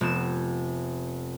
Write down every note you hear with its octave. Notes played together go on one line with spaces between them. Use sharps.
F1 B3 E7